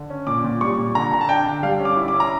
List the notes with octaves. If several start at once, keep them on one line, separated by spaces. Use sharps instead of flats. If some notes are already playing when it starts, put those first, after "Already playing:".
Already playing: D3
C#4
A#2 D6
A#2
G3 C#6
A#2
D3 A#5
D3 A#5
A5
D4 G5
D3
G3 F5
C#4
D6
E4
D6
C#4
A#5